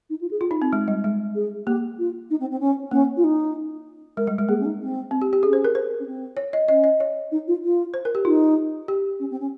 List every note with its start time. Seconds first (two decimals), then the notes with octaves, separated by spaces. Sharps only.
0.09 D#4
0.21 F4
0.30 G#4
0.41 F4
0.51 D#4
0.62 C4
0.73 G#3
0.88 G3
1.04 G#3
1.34 G#4
1.66 A#3 G4
1.98 F4
2.30 D#4
2.40 C4
2.51 C4
2.60 C#4
2.91 A#3 C#4
3.16 F4
3.23 D#4
4.17 G#3 A#4
4.27 G3
4.39 G#3
4.48 A#3 G#4
4.59 C#4
4.65 D#4
4.81 C4
5.11 C4
5.22 G4
5.33 G4
5.43 C#4 G#4
5.53 C5
5.64 A#4
5.75 C5
5.99 C#4
6.06 C4
6.37 C#5
6.53 D#5
6.68 C#4 D#5
6.84 D#5
7.00 C#5
7.31 D#4
7.47 F4
7.63 F4
7.94 C5
8.05 A#4
8.15 G4
8.25 D#4 F4
8.88 G4
9.19 C#4
9.30 C4
9.40 C#4